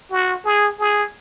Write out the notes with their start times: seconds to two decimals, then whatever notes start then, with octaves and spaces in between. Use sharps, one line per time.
0.11 F#4
0.45 G#4
0.79 G#4